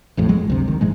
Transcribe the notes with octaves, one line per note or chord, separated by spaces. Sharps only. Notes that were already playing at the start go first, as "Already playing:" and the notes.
A1 F2 A2
G#1 F#3 G#3
G1 D2 C3
D#3
G#2 E3 G#3